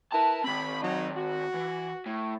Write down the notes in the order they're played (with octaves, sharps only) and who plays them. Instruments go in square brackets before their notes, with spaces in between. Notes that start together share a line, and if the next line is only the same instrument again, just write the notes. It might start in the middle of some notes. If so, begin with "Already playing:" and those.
[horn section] E4 A#4 B4 [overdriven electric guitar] A5
[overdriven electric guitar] D#3 C4 [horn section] B5
[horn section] F#3 D#4
F#4
[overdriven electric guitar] E3
A2